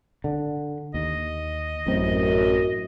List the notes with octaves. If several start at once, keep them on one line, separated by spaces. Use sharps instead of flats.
D3
D#2 D#5
A1 F#2 C4